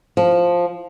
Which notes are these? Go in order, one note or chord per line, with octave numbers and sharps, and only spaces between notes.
F3